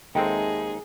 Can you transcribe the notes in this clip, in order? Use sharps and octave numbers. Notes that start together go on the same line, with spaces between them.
D#2 G#3 C4 D#4 G#4 A4 E5 G5